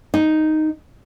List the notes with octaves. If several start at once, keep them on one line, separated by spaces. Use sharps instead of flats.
D#4